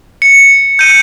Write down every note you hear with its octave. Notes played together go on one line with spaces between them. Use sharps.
C#7
G6 D#7